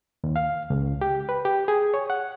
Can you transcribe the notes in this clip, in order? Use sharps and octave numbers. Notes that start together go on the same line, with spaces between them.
D#2
F5
C#2
G4
B4
G4
G#4
C#5
F#5